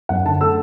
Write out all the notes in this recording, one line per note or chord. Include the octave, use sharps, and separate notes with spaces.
F#2 F#5
D3 A5
A3 E6